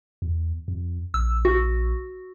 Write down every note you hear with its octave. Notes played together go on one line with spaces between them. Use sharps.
E2
F2
A#1 E6
F#4